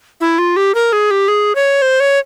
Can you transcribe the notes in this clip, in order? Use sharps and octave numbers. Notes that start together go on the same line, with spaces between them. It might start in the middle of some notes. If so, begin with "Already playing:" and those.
E4
F4
G4
A#4
G#4
G4
G#4
C#5
C5
C#5